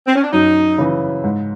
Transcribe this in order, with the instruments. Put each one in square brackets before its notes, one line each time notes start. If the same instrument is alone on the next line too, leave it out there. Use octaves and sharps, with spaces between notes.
[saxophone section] C4
C#4
D4
[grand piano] F#2 [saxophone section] D#4
[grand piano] C#3 E3
G#2